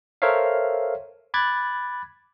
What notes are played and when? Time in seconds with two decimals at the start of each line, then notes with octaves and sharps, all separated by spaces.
0.22 A4 A#4 C5 C#5 E5 F5
1.34 B5 D6 F#6 G#6 A6